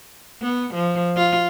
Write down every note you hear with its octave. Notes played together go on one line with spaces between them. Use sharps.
B3
F3
F4